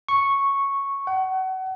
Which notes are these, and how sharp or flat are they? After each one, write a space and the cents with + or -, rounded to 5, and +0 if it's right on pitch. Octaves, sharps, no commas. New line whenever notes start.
C#6 -5
F#5 +30